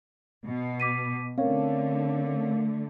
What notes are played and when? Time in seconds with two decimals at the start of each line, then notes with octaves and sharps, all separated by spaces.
0.45 B2
0.80 D6 B6 D#7
1.38 D3 A3 C4 C#4 A#4 C#5 F5